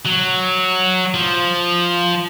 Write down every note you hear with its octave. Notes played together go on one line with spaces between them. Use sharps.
F#3
F3